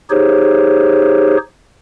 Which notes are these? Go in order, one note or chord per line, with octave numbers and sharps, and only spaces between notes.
D#4 G4 G#4 C5 C#5